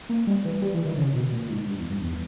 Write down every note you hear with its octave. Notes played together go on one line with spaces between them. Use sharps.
A#3
G3
E3
G3
E3
D#3
C#3
B2
A#2
G#2
G2
E2
G2
E2